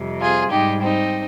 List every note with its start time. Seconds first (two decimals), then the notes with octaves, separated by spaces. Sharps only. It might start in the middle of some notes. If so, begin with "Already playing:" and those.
Already playing: F2 C3 G3
0.20 F4 G#4
0.51 G#2 G3 D#4 G4
0.81 C4 D#4